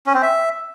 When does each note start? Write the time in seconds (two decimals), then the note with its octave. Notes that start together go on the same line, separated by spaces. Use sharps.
0.06 C#4
0.14 C4
0.22 E5